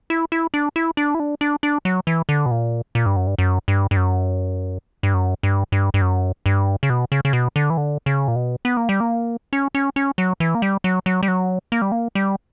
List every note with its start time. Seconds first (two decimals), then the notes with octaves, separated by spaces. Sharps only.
0.10 E4
0.32 E4
0.54 D4
0.76 E4
0.97 D4
1.14 E4
1.20 D4
1.41 D4
1.63 D4
1.85 F#3
2.07 E3
2.29 D3
2.46 B2
2.51 A#2
2.95 A#2
3.06 G2
3.16 F#2
3.27 G2
3.38 F#2
3.68 G2
3.91 G2
3.97 F#2
5.03 G2
5.14 F#2
5.43 G2
5.72 G2
5.94 G2
6.02 F#2
6.46 G2
6.83 C#3
6.90 B2
7.12 C#3
7.25 C#3
7.33 B2
7.56 D3
7.70 E3
7.77 D3
8.06 C#3
8.28 A#2
8.36 B2
8.65 B3
8.77 A#3
8.89 G3
9.00 A#3
9.53 C#4
9.75 C#4
9.96 C#4
10.18 F#3
10.40 E3
10.55 A#3
10.62 G3
10.84 F#3
11.06 F#3
11.23 G3
11.28 F#3
11.72 A#3
11.82 G3
11.92 A#3
12.15 G3